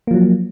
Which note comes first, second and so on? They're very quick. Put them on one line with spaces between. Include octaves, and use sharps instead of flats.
A#3 F3 F#3